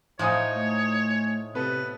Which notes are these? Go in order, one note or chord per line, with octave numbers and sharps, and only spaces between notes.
A2 F3 D#4 C5 C#5 G#5 D#6
A3
C3 B3 A4 B4